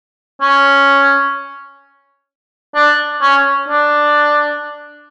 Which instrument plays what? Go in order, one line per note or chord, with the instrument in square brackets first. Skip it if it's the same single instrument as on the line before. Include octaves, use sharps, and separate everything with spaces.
[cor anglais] C#4
D4
C#4
D4